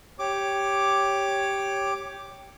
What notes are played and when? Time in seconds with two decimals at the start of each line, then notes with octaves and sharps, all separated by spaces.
0.19 G4 C#5 D6